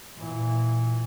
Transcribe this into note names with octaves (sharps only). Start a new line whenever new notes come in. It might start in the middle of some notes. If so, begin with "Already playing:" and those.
A#2 E3